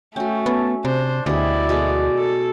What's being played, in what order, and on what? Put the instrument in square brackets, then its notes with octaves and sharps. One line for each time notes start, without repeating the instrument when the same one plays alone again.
[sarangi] A3 [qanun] C#4 F#4 [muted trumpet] G5
[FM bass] B3 [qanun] C#4 [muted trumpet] A5
[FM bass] C3 [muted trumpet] D4 [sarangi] C5
[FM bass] D2 [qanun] B2 G4 G#4 [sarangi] E4 [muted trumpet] D5
[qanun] B2 G#3 A3
[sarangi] A4